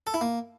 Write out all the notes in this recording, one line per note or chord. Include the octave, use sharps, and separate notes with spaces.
A4
E4
A#3